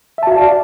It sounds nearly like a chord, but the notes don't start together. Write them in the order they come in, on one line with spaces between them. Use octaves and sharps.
E5 A5 F#4 F5 D5